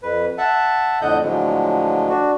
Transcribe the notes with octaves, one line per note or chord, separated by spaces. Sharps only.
F2 B4
E5 F#5 A5
F2 A2 D3 D#5 F#5 G6
A2 D3 F3 F#3 G#3
D4 F#4